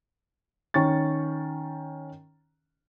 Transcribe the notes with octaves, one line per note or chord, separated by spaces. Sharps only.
D#3 C#4 C#6 A6